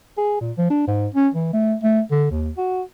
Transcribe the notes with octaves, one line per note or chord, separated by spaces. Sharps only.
G#4
A#2
F3
D4
G#2
C#4
E3
A3
A3
D3
D#2
F#4